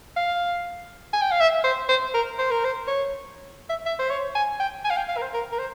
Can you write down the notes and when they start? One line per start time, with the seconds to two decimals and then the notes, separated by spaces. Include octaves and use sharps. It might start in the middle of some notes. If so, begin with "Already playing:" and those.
0.16 F5
1.13 G#5
1.22 G5
1.31 F5
1.40 E5
1.64 C5
1.89 C5
2.14 A#4
2.38 C5
2.51 A#4
2.64 C5
2.87 C#5
3.69 E5
3.86 E5
3.99 C5
4.10 C#5
4.35 G#5
4.60 G5
4.84 G#5
4.90 F5
4.97 G5
5.08 F5
5.17 A#4
5.21 C5
5.33 A#4
5.52 A#4
5.58 C5